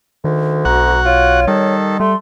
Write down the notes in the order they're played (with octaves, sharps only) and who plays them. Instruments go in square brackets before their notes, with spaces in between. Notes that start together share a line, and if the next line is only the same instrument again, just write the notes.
[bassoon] D2 [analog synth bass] D#3
[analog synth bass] B1 [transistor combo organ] F#4 F#5 [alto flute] A#5
[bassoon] F4 [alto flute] C#5
[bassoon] D#3 [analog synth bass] G3 [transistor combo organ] A4
[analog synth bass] G3 [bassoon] A3 [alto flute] C6